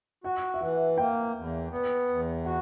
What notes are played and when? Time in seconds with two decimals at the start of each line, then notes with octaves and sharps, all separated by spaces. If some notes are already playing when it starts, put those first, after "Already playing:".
0.24 F#4 F#5
0.54 E5
0.61 E3 F#5
0.98 A#3 G5
1.35 E2
1.71 B3
2.09 E2
2.45 F#4 F#5